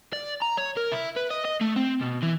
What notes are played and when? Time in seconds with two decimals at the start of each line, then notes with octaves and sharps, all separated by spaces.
0.13 D5
0.42 A#5
0.58 C#5
0.77 A#4
0.92 E4
1.17 B4
1.31 D#5
1.45 D#5
1.61 A3
1.76 C4
2.01 B2
2.23 E3